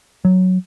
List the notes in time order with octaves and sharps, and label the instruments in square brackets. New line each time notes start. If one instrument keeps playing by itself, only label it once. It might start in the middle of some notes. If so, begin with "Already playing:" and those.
[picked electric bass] F#3